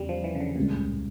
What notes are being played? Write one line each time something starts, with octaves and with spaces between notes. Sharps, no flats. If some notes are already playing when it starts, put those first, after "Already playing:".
Already playing: E2 C#3 G3 C#4
F3
E3
C#3
D3
C#2 A#2 C#3 G3
A2